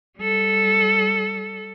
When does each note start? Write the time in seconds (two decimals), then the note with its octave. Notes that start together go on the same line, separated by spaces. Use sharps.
0.18 G3 A4